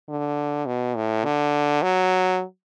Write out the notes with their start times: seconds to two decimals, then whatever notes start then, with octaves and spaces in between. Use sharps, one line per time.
0.09 D3
0.66 B2
0.96 A2
1.25 D3
1.82 F#3